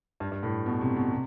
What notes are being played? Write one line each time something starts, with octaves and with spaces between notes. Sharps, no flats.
G2
G2
A2
B2
C3
B2
C3